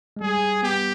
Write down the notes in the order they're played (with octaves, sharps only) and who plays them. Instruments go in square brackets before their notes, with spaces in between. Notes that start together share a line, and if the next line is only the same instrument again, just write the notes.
[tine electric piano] G#3
[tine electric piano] G3 [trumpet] G#4
[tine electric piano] B3 [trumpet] G4